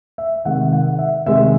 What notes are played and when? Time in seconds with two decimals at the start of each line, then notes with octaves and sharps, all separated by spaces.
0.18 E5
0.45 C3 D#3 G#3 F#5
0.73 F#5
0.99 E5
1.26 C3 D#3 G#3 E5